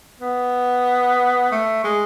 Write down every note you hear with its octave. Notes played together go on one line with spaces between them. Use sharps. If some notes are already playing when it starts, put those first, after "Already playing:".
B3
A3
G#3